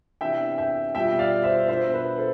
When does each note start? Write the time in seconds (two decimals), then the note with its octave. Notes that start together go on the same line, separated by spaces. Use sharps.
0.21 C3 E3 B3 D4 E5 G5
0.58 E5 G5
0.95 B2 G3 B3 F4 E5 G5
1.19 D5 F5
1.44 C5 E5
1.68 B2 B3 D4 F4 C5 E5
1.94 B4
2.18 A4 C5